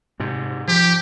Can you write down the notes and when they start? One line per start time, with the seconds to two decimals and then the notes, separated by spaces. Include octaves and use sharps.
0.20 G#2 C3
0.68 F3 G4